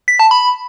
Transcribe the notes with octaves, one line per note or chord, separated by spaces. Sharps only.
B6
A5
B5